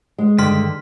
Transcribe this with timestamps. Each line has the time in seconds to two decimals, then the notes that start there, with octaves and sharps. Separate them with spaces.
0.18 G#3
0.38 G2 D3 D#3 C6 F6 B6